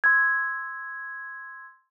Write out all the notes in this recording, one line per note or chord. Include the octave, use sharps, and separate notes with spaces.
C6 E6 G#6